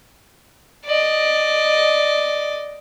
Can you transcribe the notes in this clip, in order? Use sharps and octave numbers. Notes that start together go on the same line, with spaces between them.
D5 D#5